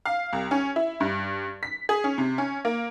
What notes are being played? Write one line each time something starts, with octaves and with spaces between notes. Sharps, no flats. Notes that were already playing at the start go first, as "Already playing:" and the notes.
F5
C2
C#4
E4
G2
B6
G#4
C#4
C3
C#4
A#3